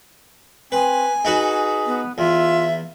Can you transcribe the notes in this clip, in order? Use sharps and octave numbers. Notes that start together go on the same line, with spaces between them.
C4 B4 G#5
D#4 F#4 G#4 B4
B3
E2 F4 E5